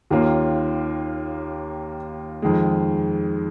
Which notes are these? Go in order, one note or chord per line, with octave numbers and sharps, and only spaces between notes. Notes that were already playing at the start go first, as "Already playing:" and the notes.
D#2 D#3 A#3 C#4 F4
F2 D#3 G#3